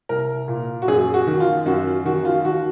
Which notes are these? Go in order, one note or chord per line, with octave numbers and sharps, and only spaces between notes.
C2 A#4
A#2
F#4
F#2 G#4
F#4
D#3
F4
F#2 F#4
D#3 F#4
F4
D#2 F#4